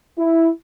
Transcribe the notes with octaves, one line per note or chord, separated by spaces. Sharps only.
E4